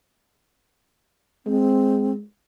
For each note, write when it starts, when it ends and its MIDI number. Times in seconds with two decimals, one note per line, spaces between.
1.46 2.23 56
1.46 2.12 60